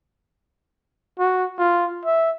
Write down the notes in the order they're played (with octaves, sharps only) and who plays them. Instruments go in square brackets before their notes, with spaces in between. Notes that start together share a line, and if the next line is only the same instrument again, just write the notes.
[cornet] F#4
F4
E5